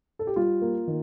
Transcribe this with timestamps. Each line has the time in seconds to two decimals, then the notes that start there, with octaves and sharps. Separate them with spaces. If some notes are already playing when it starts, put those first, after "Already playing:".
0.19 A4
0.27 G4
0.36 G3 F4
0.62 A#3
0.88 D#3